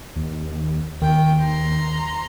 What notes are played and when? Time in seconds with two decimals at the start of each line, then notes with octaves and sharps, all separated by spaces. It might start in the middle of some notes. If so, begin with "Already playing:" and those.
0.16 D#2
1.02 D#2 D#3 G5
1.40 A#5 C6